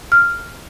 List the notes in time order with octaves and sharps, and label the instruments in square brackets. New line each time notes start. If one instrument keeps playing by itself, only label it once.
[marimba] F6